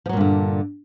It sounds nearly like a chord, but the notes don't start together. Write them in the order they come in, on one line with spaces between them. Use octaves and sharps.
F3 F#3 A#2 G2 D3